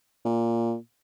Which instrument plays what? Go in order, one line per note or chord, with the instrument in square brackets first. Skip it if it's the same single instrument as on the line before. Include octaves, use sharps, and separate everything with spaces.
[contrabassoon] A#2